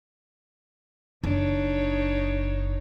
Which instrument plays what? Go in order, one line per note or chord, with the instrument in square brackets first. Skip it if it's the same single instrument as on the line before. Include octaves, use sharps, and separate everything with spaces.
[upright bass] F#1 [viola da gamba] D4 D#4 C#5